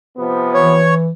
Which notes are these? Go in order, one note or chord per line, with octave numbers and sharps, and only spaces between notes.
C3 F3 B3
E3 C#5